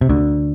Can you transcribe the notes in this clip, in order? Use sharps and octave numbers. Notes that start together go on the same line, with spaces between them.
C3
D2 D3